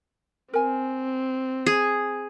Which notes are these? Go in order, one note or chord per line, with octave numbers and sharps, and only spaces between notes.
C4 A#4 G#5
G#4